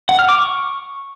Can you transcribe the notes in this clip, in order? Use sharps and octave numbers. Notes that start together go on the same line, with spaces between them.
F#5
F6
D6
C#6